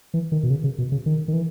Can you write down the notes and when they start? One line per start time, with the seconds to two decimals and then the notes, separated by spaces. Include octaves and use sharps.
0.14 E3
0.32 D#3
0.43 B2
0.50 C#3
0.64 C#3
0.78 B2
0.92 C#3
1.06 D#3
1.28 D#3
1.33 E3